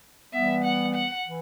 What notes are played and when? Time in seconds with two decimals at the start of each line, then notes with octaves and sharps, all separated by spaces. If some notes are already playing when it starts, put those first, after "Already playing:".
0.34 E3 G3 B3 E5
0.65 F#5
0.95 F#5
1.27 E3